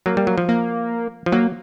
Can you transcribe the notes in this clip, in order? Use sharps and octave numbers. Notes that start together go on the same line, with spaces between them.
F#3 A#3
G3
F#3
F3
A#3
F3
F#3 A#3